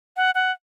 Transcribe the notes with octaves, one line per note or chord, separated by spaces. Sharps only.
F#5
F#5